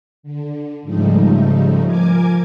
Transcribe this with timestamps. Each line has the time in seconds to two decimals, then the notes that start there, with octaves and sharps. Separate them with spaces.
0.23 D3
0.83 G#2 C#3 F3 G3 A3 D#4
1.84 F3 A#4 G#5 D6 G#6